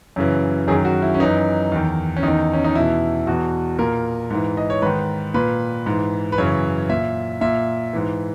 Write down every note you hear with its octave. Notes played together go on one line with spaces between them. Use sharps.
F#2 C#3 E3
F#2 D#3 G#4
F#4
E4
C#4
F#2 E3 D#4
E2 D#3
C#4
E2 D#3 D#4
C#4
D#4
E2 B2 E4
E2 B2 F#4
A#2 A#4
G#2 E3
D#5
C#5
G#2 D#3 B4
A#2 B4
G#2 E3
B4
F#2 C#3 E3 C#5
A#2 E5
A#2 E5
G#2 E3